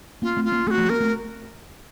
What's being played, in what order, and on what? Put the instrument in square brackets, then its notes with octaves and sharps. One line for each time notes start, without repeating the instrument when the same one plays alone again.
[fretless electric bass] A#3 C#4 [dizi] F4
[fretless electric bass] A3 C4
[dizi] F4
[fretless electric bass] A#3 C#4
[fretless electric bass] A3 C4 [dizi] A4
[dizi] F#4
[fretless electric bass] F3 A3
[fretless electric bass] A#3 C#4 [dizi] A#4
[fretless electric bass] A3 C4